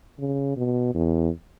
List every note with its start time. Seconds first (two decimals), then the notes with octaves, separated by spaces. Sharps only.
0.19 C#3
0.57 B2
0.95 E2